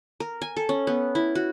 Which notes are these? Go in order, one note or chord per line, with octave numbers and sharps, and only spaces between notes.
A#4
G#5
A4
C#4
B3
E4
F#4